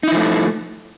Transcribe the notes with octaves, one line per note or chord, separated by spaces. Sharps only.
F3 A3 D#4 E4